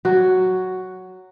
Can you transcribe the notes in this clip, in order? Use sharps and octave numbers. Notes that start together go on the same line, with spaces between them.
F#3 F#4